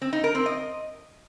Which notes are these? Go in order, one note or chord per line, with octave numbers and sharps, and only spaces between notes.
C4
D#4
A#4
C4
D#5